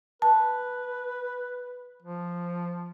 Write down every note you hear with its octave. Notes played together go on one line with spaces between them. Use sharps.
B4 A5
F3